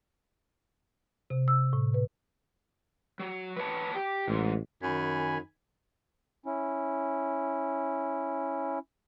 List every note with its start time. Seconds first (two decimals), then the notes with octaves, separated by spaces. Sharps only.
1.30 C3
1.48 E6
1.73 A2
1.94 B4
3.19 F#3
3.57 B4 C#5 A5
3.94 G4
4.28 A1 G#2
4.82 F#2 D#3 G#5 B5
6.46 C#4 E4